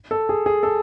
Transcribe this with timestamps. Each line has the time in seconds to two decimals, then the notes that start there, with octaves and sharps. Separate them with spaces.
0.11 A4
0.29 G#4
0.46 G#4
0.63 A4